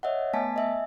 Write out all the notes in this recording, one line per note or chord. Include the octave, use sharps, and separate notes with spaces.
C#5 D#5 E5 F#5
A3 B3 G#5 A5 B6
D#5 E5 G#5